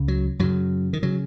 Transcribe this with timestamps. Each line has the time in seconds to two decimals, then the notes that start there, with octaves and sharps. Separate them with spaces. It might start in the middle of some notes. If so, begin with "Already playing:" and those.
Already playing: C#2 C#3
0.08 F#3
0.39 F#2 C#3 F#3
0.93 D#3
1.03 C#3 F#3